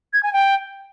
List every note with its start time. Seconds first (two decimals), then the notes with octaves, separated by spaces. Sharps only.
0.13 G#6
0.23 G#5
0.33 G5